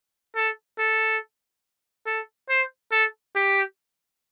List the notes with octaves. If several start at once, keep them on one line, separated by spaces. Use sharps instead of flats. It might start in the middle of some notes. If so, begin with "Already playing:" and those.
A4
A4
A4
C5
A4
G4